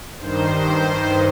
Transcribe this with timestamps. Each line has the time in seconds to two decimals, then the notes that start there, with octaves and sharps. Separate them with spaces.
0.20 G2 D#3 C5
0.54 C5